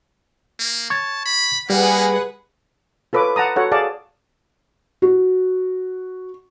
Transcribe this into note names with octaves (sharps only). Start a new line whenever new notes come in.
A#3
A5 C#6 G#6
B5
G3 A#3 G#4 B4 F#5
F4 A4 B4 C#5 D6
F#5 A5 A#5 D#6
F#4 A4 C#5 F#5
G#4 D5 F5 A5
F#4